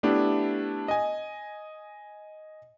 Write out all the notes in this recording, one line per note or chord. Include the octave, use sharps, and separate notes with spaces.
A3 B3 D4 E4 G4
D#5 G#5